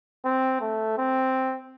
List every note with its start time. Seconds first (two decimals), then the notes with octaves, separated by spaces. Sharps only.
0.25 C4
0.61 A3
0.97 C4